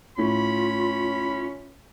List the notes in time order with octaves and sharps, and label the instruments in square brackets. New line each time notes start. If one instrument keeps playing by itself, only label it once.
[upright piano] A2 [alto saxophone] C#4 [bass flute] F4 [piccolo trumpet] B5